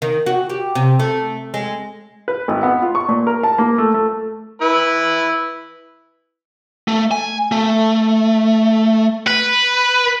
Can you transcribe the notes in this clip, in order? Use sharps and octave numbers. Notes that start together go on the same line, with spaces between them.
D#3
F#4
G4
C3
A3
G#3
B4
G#1
B3
F4
C#6
A#2
A#4
A5
A#3
A3
A3
E4 B4
A3
G#5
A3
B4